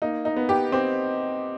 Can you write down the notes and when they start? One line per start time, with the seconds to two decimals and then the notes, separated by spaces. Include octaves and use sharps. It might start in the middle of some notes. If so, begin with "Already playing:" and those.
0.02 A#3 D#4
0.25 D#4
0.36 B3
0.49 G4
0.72 C4 G4